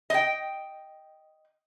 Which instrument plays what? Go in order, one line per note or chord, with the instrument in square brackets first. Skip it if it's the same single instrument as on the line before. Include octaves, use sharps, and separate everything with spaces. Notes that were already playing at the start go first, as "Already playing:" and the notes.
[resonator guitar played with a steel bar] D#5 G5